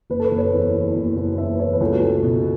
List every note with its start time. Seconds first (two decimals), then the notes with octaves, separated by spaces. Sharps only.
0.10 F#1 B4
0.20 A4
0.24 B4
0.31 F#1
0.38 C#5
0.53 E2
0.74 E3
0.96 F#1
1.17 F#1
1.38 E2 E5
1.55 B4
1.60 E3 C#5
1.73 B4
1.81 C#2 A4
1.93 F#4
2.02 C#2 A4
2.23 B2